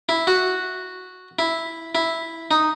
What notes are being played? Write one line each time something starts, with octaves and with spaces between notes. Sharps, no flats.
E4
F#4
E4
E4
D#4